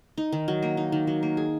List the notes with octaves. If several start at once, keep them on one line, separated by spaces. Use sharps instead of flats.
D#4
D#3
F#3
A#3
D#4
D#3
F#3
A#3
G#4